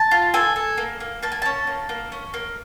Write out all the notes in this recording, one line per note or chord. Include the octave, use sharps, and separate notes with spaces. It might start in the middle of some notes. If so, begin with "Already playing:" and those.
Already playing: A5
F4
A4 G#5
A4
A#3
A#3
A#3 A5
G#5
C#4 A5
A#3
A#3
C#4
A#3